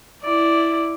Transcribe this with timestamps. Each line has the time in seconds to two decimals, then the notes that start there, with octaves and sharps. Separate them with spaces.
0.23 E4 D5